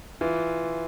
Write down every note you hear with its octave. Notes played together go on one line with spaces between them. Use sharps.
E3 F4